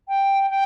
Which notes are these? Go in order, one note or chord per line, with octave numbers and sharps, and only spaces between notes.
G5
G5